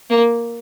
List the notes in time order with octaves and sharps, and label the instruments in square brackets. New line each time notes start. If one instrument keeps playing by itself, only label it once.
[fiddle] A#3